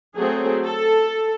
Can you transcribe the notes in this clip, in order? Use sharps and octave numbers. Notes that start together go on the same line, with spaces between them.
F#3 A3 C4 G#4
A4